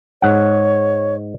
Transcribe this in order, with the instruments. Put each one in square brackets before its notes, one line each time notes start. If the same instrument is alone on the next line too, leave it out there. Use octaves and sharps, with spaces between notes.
[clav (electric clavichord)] G#2 F#5 [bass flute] C#5